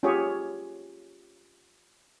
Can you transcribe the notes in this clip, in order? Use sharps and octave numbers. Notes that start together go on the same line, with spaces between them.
C#4 F4 G4 G#4 C#5